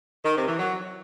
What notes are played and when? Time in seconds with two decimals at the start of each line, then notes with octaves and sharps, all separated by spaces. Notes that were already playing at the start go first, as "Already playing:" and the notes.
0.25 D#3
0.36 C3
0.48 E3
0.59 F#3